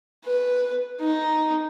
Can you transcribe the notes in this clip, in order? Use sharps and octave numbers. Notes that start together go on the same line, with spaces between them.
B4
D#4